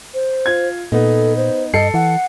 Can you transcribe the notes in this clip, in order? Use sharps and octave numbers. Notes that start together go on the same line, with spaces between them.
C5
F4 G#6
A#2 B3 D#4 A4
C5
G2 A4 D#5 C7 C#7
E3 F#5